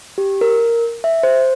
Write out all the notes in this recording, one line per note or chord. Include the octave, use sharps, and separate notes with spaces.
G4
A#4
E5
C5